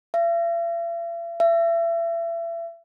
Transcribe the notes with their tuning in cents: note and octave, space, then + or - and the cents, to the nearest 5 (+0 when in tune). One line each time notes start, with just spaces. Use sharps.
E5 +45
E5 +30